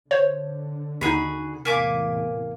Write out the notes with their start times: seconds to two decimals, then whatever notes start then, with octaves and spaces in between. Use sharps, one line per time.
0.11 D3 C5 C#5
1.01 D#2 D#4 F#4 G#4 B5
1.65 E2 A2 C3 A#3 G#5 D6 B6